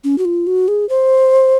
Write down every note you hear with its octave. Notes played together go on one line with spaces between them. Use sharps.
C#4
F#4
F4
F#4
G#4
C5